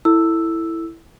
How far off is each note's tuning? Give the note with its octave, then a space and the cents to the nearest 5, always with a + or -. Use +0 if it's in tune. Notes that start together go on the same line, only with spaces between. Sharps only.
E4 +0 A4 +20 E6 +0